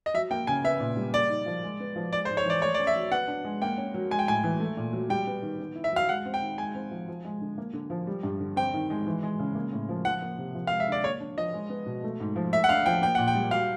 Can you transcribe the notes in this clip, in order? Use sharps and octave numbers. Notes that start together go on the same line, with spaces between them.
D#5
F#3 E5
A#3 G5
C#3 G#5
B3 E5
A#2
G3
A#3 D5
D#4
F3
G#3
B3
F3
G#3 D5
C5
G#2
C#5
E3 D5
A3 C#5
D5
C#4
E5
F#3
B3 F#5
D4
G#3
A#3 G5
C#4
F#3
G#3 G#5
G5
A2 G#5
E3
A3
A#2
F#3
G3 G5
B3
D#3
B3
E4
E5
F#3 F5
G#3 F#5
C4
G5
D#3
G#3 G#5
C4
F3
F3
G#3
D3
A#3
D3
F3
G3
G2
D3
C4 G5
D#3
G#3
E3
G#3
C#3
A#3
A2
F3
F3 F#5
A#3
C3
F3
F5
G#3
E5
D3 D5
A#3 C#5
D4
F3 D#5
G#3
B3
B2
A3
G#2
F3
A3 E5
F#5
D4 F5
F3 G5
A#3 G5
A#2 F#5
G5
G3
F#3 F5